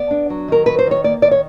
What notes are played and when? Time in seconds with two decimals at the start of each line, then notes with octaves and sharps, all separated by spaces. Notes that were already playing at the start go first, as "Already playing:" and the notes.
Already playing: B3 D5
0.11 D4
0.30 F#3
0.48 D#3 A#4
0.66 F#3 B4
0.79 C5
0.86 D#3 C#5
1.04 A#3 D5
1.22 D#3 D5
1.31 C#5